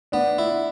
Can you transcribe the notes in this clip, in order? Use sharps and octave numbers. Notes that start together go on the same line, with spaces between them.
B3 D4
E4